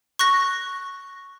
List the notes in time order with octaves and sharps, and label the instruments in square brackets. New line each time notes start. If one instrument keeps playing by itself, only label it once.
[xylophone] C#6 F#6 A#6